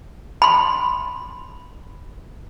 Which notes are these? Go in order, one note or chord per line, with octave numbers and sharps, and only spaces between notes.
B5 C6